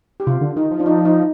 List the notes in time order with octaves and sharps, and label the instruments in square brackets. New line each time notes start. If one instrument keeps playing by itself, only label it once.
[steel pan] G4
[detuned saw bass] C3 [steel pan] F4
[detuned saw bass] D3
[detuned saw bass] D#3 [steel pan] D#4
[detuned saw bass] F3
[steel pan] D4
D#4
D#4